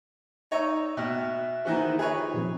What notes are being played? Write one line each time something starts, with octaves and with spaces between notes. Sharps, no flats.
D#4 C#5 D5 E6
B2 E5 G5 F6 F#6
D#3 E3 F#4 G#4 C5 F#5
D#3 F4 G4 G#4 B4 C#5
A#2 F3 C4